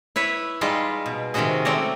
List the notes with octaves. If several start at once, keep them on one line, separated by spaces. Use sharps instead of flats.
E4 B4 C#5 E5
G3 G#3 D#4 F4 G#4
B2
C3 D#3 G#3 C#4 F#4 G#4
A3 C4 C#5 D5 A#5